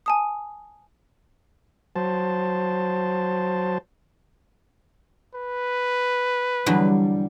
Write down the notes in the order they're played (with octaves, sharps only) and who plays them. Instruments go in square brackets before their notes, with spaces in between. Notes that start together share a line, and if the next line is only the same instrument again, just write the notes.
[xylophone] G#5 A5 D#6
[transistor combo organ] F#3 C5 A5
[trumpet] B4
[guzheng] E2 D3 F#3 [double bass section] G3